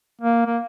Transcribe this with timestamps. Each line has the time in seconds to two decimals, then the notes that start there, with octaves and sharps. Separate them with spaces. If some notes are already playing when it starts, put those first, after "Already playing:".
0.21 A#3
0.47 A#3